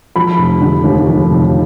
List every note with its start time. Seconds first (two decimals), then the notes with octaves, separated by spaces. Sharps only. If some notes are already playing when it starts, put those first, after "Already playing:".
0.16 F3 B5
0.38 F1
0.61 D3
0.84 D#2
1.07 F3
1.31 F1